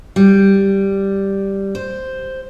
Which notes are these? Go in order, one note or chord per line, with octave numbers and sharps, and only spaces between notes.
G3
C5